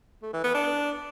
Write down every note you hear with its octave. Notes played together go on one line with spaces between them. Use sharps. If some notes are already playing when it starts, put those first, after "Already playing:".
A3
E3
B3
D4